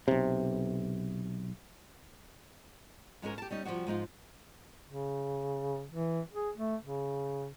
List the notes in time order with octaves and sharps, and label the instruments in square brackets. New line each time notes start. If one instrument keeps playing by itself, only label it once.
[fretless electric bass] B1 C3
[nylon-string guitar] G#2 G#3 C#4 A#4
G4 A5
G3 C#4 D#4
C3 F3 G3 D4 F#4
G#2 F3 D#4 F4
[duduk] C#3
E3
G#4
A3
C#3